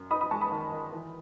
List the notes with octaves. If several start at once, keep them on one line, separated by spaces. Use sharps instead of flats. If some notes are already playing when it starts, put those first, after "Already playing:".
Already playing: F#2
D#4 B5 D#6
B5 D#6
G#3 A5 C#6
B5 D#6
D#3
D#3
E3